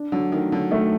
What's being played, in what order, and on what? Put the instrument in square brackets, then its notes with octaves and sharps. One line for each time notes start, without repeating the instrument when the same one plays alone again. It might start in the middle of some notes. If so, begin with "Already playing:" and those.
Already playing: [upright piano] D4
[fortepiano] D3 [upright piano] F#3
[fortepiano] D#3 [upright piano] A3
[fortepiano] D3 [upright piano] F#3
[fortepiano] D#3 [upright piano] A3